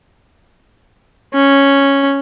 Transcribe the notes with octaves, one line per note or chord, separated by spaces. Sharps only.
C#4